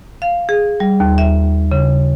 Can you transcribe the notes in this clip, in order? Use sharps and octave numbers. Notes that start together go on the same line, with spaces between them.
F5
G#4
G3
D#2
E5
C#3